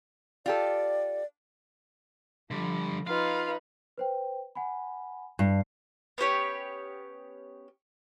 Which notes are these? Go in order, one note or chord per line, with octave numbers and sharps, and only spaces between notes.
F4 G4 A4 D5
D3 F3 G3
D#4 F4 B4 F5
B4 C5 G5
F#5 G#5 B5
G2 C7
B3 C#4 G4 C#5